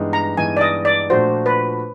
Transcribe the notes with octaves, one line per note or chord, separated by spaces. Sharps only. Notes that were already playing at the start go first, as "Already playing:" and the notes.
Already playing: G2 E3 G#3 B3 D#4
A#5
G2 E3 G#3 B3 D#4 G#5
D5
D#5
D5
A#2 F3 A3 D4 F#4 C5
B4